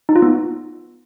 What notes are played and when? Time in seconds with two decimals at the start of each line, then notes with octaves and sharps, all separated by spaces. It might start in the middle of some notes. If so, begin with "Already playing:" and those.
0.09 D#4
0.16 F4
0.22 B3